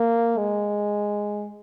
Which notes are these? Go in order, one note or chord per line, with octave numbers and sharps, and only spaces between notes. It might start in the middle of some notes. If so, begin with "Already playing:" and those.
Already playing: A#3
G#3